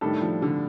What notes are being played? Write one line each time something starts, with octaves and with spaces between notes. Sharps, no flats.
A2 D#3 G3 D4 A4
F3
D3